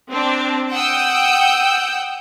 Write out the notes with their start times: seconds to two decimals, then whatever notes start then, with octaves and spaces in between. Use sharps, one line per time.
0.10 C4 D4
0.72 F#5 G5 D#6 E6 G6